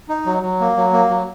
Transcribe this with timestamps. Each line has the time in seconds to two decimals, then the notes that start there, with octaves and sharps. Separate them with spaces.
0.09 D#4
0.26 F#3
0.43 F#3
0.60 A#3
0.77 F#3
0.93 A#3
1.10 F#3